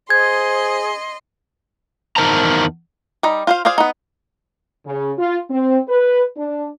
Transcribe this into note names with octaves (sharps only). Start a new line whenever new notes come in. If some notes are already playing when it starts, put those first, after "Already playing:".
G#4 C5 D#5 C6 G#6
E2 D#4 A#4 C5 A5 A#5
G3 D#4
F4 C5 F5
F4 G#4 C5 D5 F5
B3 D#4
C#3
F4
C4
B4
D4